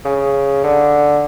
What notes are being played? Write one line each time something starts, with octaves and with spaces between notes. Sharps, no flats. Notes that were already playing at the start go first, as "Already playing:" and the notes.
C#3
D3